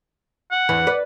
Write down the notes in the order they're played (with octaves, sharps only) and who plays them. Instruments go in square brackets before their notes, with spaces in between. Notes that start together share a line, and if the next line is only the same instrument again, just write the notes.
[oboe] F#5
[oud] E2 E3
B4 D5